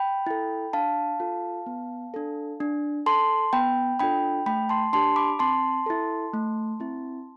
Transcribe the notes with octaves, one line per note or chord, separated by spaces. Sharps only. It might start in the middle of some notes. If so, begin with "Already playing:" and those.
Already playing: G5 B5
E4 A4
D4 F5 A5
F4 A4
B3
D4 A4
D4
A4 A5 C6
B3 G5 B5
D4 F4 A4 G5 B5
A3 G5 B5
A5 C6
D4 G4 A5 C6
B5 D6
C4 A5 C6
E4 A4
A3
C4 E4